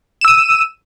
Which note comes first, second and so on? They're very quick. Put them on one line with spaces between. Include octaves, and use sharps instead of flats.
E7 E6 D#7